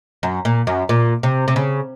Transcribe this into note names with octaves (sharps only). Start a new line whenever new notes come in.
F#2
A#2
F#2
A#2
C3
C3
C#3